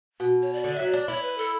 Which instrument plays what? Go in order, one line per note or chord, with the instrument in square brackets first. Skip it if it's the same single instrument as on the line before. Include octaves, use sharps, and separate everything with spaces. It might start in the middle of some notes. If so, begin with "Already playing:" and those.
[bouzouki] B2
[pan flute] C#5
D5
[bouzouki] D3 [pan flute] D5
[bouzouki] F#3 [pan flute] E5
[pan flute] D5
[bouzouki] D4
[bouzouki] E4 [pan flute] C#5
[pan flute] B4
A4